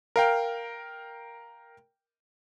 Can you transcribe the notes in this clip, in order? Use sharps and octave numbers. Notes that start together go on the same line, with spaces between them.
A#4 F5 G5